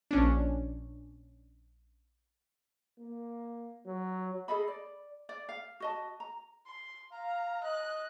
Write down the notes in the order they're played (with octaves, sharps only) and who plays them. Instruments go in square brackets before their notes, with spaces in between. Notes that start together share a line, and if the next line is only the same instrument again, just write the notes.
[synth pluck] A#1 C#4 D4
[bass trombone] A#3
F#3
[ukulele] G#4 A4 D#5 B5
D5
D5
F5
F#4 D#5 A5
A#5
[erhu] C6
[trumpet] F5 [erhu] A#5
[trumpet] D#5 [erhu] F#6